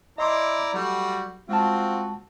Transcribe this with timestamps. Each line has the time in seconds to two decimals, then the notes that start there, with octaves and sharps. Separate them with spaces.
0.18 E4 D5 D#5 A#5 C6 D6
0.74 F#3 G3 A3 F#4
1.49 G#3 C4 F4 F#4 A5